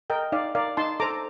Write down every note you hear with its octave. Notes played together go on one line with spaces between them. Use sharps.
A#4 D#5 G5
D#4 D5 F5
A#4 D5 F5
D#4 A5 C6
A4 C5 A#5 D6